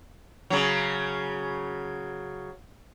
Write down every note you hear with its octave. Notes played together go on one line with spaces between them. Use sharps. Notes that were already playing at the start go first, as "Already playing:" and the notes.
C#3 F#3